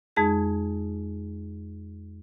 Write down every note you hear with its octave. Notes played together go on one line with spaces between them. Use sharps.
F2 G#3 D#4 G#4 G#6